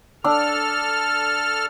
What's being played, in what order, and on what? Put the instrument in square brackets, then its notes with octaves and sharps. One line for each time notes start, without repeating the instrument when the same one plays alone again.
[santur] D4 F#5 E6 [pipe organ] A4 F6